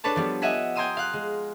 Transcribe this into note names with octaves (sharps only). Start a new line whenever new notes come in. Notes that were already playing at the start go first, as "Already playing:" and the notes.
D4 A4 B4 C#5 A5
F3 G3 B3
D#5 E5 F#5 G#5 B6
G5 G#5 A#5 C6 D#6 E6
F5 F#6
G#3